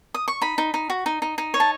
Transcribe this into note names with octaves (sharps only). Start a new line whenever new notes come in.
D#6
C#6
D#4 B5
D#4
D#4
F#4
D#4
D#4
D#4
C#5
A5